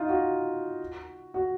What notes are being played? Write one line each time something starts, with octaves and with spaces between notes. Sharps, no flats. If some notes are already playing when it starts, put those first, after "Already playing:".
Already playing: D#4 F4
F#4
F#4